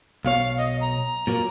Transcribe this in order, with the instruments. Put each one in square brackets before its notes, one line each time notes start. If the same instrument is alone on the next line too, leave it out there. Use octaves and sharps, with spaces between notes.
[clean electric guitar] B1 B2 C#5 [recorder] F5
[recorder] D#5
A#5
[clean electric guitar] A#2 F#3 A#3